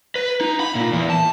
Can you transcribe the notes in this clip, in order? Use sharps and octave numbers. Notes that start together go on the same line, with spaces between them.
B4
D#4
B5
A#2
E2
A5